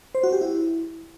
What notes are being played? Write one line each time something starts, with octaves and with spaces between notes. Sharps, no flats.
C5
F#4
G4
E4